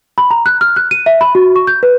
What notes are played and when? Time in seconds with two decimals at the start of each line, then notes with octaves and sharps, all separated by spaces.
0.18 B5
0.31 A#5
0.46 F#6
0.61 F6
0.76 F#6
0.91 D#7
1.06 E5
1.21 B5
1.35 F#4
1.56 C#6
1.67 G6
1.83 B4